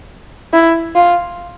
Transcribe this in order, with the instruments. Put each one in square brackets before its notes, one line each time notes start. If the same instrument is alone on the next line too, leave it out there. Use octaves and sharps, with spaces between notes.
[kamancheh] E4
F4